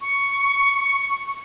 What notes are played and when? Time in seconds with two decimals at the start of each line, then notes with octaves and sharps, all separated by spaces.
0.01 C#6